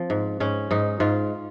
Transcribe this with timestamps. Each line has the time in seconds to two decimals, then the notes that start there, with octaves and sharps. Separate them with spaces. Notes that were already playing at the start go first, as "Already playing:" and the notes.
Already playing: F3 C4
0.10 G#2
0.40 G#2 C#4
0.71 G#2 D#4
1.00 G#2 F4